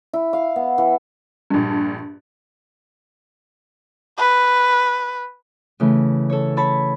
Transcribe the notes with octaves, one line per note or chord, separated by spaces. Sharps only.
E4
F5
B3
E3
A#1 G2
B4
C#3 E3 A3
A4 C#5
C#5 A5 B5